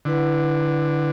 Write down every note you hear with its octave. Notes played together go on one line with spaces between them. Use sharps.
D3 E4 B4 F#5